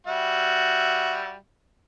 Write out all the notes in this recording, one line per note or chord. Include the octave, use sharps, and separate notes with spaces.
G3 F#4 E5